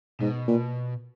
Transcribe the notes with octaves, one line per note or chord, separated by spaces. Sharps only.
G#2 B2
A#2